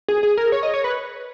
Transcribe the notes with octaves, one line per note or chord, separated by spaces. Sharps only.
G#4
G#4
A#4
C#5
D#5
C#5
B4